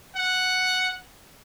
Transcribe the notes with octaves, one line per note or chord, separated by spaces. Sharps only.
F#5